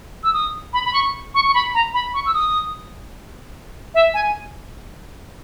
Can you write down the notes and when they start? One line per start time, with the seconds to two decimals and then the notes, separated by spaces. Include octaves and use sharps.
0.23 E6
0.33 D#6
0.73 B5
0.85 B5
0.93 C#6
1.34 C#6
1.48 C#6
1.54 B5
1.74 A#5
1.94 B5
2.14 C#6
2.26 E6
2.34 D#6
3.94 E5
4.14 G#5